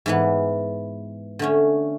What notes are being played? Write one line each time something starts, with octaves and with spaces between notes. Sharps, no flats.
G#2 E3 B3
D3 A3 C#4